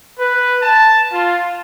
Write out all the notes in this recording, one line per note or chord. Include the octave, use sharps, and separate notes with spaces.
B4
A5
F4